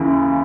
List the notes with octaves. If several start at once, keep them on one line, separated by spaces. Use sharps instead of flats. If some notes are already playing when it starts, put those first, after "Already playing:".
Already playing: D#2 C#3 E3